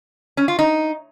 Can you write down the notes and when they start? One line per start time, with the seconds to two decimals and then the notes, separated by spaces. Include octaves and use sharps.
0.37 C#4
0.48 F4
0.59 D#4